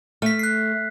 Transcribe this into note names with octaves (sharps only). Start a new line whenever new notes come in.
A3 F6 B6
F#6 C7